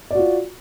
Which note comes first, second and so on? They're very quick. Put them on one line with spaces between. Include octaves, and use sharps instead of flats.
D5 F#4 F4